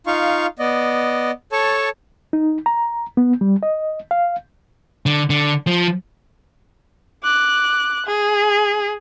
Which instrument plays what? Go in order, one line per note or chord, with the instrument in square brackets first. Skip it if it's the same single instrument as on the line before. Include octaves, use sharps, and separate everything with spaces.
[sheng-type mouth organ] D#4 F4 F5 C#6
B3 D5 D#5
A4 C#5 A5 C#6
[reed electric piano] D#4
A#5
B3
G3
D#5
F5
[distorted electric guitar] D3
D3
F3
[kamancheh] D6 F#6
G#4